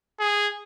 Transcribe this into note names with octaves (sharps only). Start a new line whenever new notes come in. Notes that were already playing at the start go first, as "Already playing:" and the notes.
G#4